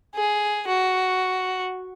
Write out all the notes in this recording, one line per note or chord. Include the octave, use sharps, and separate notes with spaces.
G#4
F#4